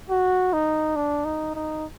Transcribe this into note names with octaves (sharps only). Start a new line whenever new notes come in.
F#4
D#4
D4
D#4
D#4